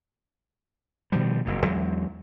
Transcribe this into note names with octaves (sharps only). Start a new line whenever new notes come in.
B2 D#3 F3 G3
F#1 F2 A#2
E2 F#3 G#3